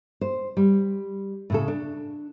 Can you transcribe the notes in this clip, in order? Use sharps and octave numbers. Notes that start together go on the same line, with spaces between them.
C5
G3
A2 C#3 A4
D4